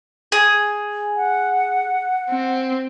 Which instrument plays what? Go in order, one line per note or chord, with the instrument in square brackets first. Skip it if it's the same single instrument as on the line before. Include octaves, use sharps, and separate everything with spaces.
[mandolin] G#4
[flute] F#5
[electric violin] C4